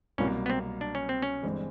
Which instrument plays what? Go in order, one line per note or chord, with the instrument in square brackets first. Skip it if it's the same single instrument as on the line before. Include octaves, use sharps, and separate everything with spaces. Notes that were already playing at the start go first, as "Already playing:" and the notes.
[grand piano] C2 B2 F#3 A#3 [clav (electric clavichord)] C#4
[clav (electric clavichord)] B3
C4
D4
C#4
C4
C#4
[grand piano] G1 G2 E3 G#3 C4